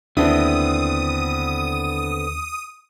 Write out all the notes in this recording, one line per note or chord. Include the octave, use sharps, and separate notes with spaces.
D#2 D3 B3 C4 D4 E4 D#6